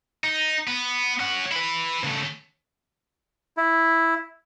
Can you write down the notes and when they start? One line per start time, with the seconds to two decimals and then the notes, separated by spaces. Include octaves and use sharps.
0.24 D#4
0.67 B3
1.20 C#4 F#5
1.52 E4 B4
2.04 C#3 A3
3.57 E4